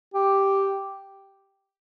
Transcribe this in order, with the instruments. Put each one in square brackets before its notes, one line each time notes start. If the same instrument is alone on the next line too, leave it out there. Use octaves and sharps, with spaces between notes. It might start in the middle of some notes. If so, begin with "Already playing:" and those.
[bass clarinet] G4